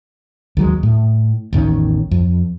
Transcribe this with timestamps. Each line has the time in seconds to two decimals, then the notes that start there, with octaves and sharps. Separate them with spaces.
0.57 D#2 F#3 G#3
0.83 A2
1.53 A1 E2 D#3 C#4
2.11 F2